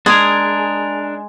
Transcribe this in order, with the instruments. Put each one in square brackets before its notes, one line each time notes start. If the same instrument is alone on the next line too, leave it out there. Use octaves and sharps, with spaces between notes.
[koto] G#3 G#4 [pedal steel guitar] D4 A#4